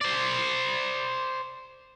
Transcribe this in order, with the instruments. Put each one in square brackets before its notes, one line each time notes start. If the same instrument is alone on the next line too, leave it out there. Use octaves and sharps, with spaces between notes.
[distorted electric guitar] C5 D5